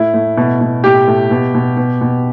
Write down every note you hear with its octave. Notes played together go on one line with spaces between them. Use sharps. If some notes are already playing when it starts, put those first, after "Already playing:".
Already playing: A2 E4
A2
B2
B2
A2 G4
A2
B2
B2
B2
B2